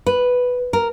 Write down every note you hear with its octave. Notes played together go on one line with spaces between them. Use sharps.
B4
A#4